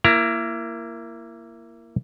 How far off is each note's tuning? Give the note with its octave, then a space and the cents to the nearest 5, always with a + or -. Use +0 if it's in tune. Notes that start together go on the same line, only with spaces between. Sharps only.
A#3 +0 E4 +25 A#5 +0